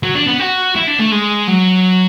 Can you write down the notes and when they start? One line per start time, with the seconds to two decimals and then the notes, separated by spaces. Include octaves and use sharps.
0.03 F#3
0.15 D4
0.27 B3
0.39 F#4
0.76 E4
0.87 D4
0.99 A3
1.12 G#3
1.48 F#3